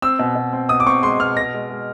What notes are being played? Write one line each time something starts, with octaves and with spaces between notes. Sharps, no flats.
C4 E6
B2
B2
C4
B2 D#6
D6
C4 C#6
G#3 C6
B2 F6
B2 A#6
G#3
G#3